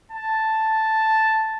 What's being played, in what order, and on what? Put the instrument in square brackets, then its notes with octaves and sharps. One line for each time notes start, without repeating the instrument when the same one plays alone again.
[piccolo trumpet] A5